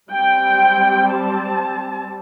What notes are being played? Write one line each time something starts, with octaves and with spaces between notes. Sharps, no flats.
G3 C4 G5
A5